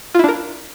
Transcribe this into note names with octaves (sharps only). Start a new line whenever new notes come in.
D4 E4 F4 A#4